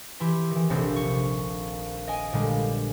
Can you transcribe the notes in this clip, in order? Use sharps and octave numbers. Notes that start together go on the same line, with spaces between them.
E3 E4 G4 C6
D#3 E3
F1 A#1 C3 C4
C#6
D#5 G#5 D7
A#2 D3 G3 G#3